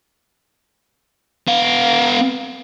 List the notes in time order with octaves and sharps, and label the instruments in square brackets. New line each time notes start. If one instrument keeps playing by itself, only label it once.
[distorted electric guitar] B3 F5